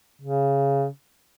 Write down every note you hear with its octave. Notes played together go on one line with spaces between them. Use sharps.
C#3